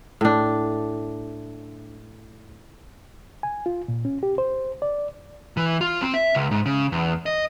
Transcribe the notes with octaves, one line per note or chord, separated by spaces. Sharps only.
A2 D4
G#5
F4
A#2
C#4
G4
C5
D5
E3
F4
C4
E5
C#2
G#2
C#3
E2
D#5